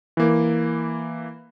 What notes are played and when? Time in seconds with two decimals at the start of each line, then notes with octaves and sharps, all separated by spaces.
0.17 E3 A#3